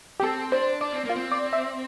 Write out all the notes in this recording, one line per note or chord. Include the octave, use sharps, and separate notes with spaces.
G4
C4 A4
D4 C5
D4 D5
C4
A#3 F4
C4
D5
E5